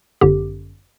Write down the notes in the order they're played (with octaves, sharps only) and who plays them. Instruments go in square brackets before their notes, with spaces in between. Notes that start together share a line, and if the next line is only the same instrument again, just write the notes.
[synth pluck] G1 F#2 D3 G4